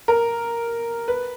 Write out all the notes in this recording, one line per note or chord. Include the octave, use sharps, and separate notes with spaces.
A#4
B4